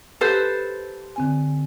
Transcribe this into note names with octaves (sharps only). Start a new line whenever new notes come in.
G4 A4 B4 C5
D3 C4 G#5